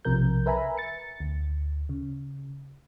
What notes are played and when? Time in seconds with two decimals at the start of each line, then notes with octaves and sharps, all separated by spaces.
0.05 B1 C3 F3 A#4 G6
0.46 A#4 B4 E5 G#5 A#5 B5
0.77 A6 C#7
1.20 D2
1.89 C#3